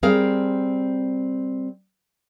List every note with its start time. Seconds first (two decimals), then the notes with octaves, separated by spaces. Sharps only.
0.03 G3 C4 G#4 A#4 F5